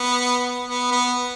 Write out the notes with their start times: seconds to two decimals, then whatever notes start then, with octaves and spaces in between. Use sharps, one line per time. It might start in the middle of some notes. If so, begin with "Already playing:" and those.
Already playing: B3
0.68 B3
0.91 B3